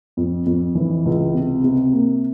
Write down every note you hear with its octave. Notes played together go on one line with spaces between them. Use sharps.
F2
F2
E3
C#2
C3
C3
A#3